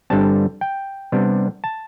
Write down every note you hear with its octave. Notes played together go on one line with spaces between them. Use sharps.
G2 D3 G3 C4 A5
G5
C3 G3 B3 D4
A5